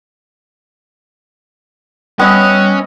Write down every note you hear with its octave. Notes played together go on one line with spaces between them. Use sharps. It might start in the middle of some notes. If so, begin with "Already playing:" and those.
G3 B3 C#4 D#5 E5 F#6